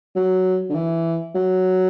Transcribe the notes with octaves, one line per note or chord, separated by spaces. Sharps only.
F#3
D3
E3
F#3